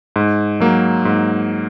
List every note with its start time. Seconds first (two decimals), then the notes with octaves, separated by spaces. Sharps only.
0.16 G#2
0.60 F#3 A#3
1.05 G#2